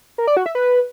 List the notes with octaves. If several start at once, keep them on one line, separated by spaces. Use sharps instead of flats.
A#4
D5
F#4
E5
B4